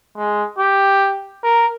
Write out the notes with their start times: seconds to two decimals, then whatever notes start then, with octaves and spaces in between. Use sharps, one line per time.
0.18 G#3
0.59 G4
1.44 A#4